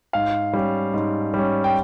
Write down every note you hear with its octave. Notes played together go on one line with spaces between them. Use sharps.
G#2 F5
G3 C#4
G#2
G3 C#4
G5